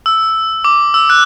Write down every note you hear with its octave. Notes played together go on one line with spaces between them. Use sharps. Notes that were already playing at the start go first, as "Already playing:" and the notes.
E6
D6
E6
F#6